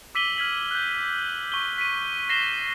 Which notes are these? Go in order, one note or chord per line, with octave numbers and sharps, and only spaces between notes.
D6 E6 B6 D#7 F#7 G7
F6 G#6 B6 F#7
F#6 G6
C#6 G7
B6 D#7
A#6 C7 E7 G7